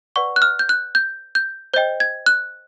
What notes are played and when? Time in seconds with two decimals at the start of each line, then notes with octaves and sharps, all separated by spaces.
0.16 B4 D5 F#5 C#6
0.36 F#6
0.42 F6
0.59 G6
0.69 F#6
0.95 G6
1.35 G6
1.74 C5 D#5 G5 G6
2.00 G#6
2.26 F#6